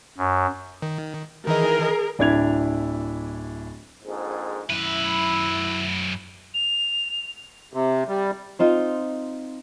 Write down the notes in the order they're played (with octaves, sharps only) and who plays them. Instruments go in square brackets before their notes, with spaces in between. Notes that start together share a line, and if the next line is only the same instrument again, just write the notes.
[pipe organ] F#2
[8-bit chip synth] D#3
[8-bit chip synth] D#3 E3 D#5 [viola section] G#4 A#4
[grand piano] D1 D4 E4 G#6 F7
[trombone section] A#1 F2 G#2
[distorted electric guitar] F#2 B4 [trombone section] E4
[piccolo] F7
[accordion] C3
G3
[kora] C4 D#4 F4